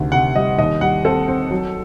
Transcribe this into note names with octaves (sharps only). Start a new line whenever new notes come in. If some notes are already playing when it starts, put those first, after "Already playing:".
Already playing: D2 C3 D#3
C3 F#5
G3 D#5
D#2 D#5
G3 F#5
C4 A4
C4
F#3